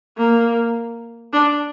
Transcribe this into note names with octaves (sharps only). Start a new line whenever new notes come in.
A#3
D4